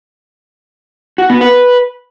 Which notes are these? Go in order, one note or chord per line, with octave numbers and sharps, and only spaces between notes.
F#4
B3
B4